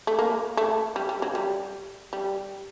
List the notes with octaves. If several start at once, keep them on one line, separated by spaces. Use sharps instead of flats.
A3
A#3
A3
G3
G3
F#3
G3
G3